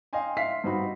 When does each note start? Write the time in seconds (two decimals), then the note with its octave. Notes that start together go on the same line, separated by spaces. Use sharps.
0.13 D#5 F5 G5 G#5 C6
0.37 E5 F5 C6 B6 C7
0.64 G2 C4 D#4 F#4 B5